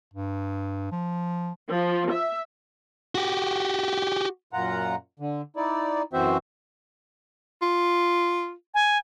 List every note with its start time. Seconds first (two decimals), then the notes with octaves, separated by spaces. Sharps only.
0.14 G2
0.92 F3
1.70 F3
2.12 E5
3.15 F#4 G4
4.53 F#2 A#2 F4 F#5 A#5
5.20 D3
5.56 D#4 E4 D5
6.13 F#2 E3 C4 F#4 C5 E5
7.62 F4
8.74 G#5